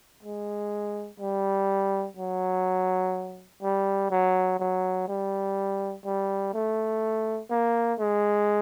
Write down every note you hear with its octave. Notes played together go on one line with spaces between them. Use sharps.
G#3
G3
F#3
G3
F#3
F#3
G3
G3
A3
A#3
G#3